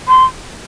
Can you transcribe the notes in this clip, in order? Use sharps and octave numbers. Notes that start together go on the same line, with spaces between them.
C6